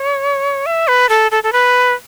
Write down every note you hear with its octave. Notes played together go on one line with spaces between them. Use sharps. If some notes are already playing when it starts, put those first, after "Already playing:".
Already playing: C#5
E5
B4
A4
A4
A4
B4